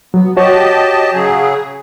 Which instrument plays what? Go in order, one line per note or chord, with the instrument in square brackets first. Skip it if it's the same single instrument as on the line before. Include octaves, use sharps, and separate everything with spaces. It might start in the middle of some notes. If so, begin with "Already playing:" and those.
[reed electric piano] F#3 [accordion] B3
[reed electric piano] F#4 C#5 [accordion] G4 D#5 A5
[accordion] C#3 F#3 G#4